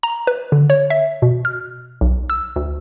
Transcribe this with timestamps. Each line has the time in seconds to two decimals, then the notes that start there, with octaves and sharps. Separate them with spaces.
0.03 A#5
0.27 B4
0.52 D3
0.70 C#5
0.90 E5
1.22 B2
1.45 F6
2.01 B1
2.30 E6
2.56 D2